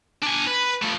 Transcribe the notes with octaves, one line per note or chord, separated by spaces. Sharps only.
D4 G#5
B4
F3 A3